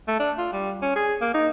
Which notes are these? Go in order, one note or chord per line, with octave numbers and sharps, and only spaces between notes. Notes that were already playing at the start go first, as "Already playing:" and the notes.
A3
D4
F4
G3
C#4
G#4
A#3
D#4